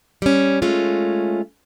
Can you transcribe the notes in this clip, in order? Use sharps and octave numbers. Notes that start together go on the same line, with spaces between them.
G3 C#4
G#3 A3 C#4 F4